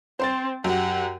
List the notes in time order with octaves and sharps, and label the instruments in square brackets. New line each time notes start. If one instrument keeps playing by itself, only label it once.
[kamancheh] C4 [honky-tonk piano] C5 C6 A6
[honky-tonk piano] F#2 [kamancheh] G4 F#5